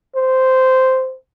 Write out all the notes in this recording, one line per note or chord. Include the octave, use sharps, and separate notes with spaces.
C5